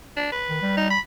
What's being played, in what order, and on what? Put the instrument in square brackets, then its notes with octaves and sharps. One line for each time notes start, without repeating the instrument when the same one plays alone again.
[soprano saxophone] D4
B4
[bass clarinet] D#3
G3
[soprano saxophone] D#4
B5